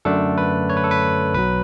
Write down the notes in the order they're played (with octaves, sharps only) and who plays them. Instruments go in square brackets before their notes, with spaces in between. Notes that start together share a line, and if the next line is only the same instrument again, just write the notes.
[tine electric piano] F#2 D3 A3 D4 A4
B4
C#5
B4
A4
B4
B1 B2 F#3 B4